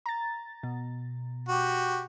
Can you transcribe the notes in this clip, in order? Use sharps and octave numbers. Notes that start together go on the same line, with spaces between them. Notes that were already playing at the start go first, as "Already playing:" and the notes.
A#5 A6
B2
F#4 G4